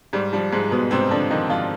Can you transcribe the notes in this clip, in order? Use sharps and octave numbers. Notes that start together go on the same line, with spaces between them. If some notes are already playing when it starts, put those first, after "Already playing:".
G#2 G3
F3 G3
G#2 F3 G#3
G#2 B2 B3
G#2 C3 C4
D3 F3 D4
D#3 F3 D#4
G#2 F3 F4